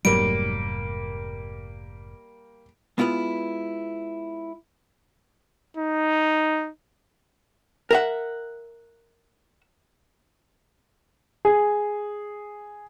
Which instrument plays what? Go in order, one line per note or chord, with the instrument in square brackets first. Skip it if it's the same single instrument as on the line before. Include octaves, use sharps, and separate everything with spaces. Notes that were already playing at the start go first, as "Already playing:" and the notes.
[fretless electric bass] F1 G#2 F#3 [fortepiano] G3 A#3 [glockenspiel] D7
[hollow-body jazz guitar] G#3 B3 E4 F4 B4
[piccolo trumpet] D#4
[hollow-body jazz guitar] A#4 E5 F#5
[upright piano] G#4